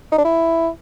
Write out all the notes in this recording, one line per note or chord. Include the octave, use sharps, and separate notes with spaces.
D#4
D4
E4